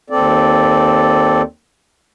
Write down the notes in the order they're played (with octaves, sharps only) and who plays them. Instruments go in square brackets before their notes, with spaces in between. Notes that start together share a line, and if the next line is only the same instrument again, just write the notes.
[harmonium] D#2 C4 A4 D5